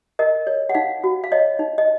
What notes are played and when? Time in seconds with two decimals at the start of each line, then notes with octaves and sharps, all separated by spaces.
0.19 A#4 D#5
0.47 C#5
0.69 F#5
0.75 D#4 F5
1.04 F#4
1.24 F5
1.32 C#5 D#5
1.59 D#4
1.78 D#5